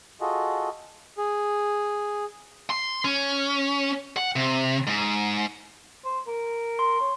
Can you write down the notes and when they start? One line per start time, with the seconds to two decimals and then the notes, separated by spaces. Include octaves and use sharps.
0.21 F4 F#4 G#4 A4 D#5
1.18 G#4
2.70 C6
3.05 C#4
4.17 F#5
4.36 C3
4.87 G#2
6.05 C5
6.27 A#4
6.79 C6
7.00 C#5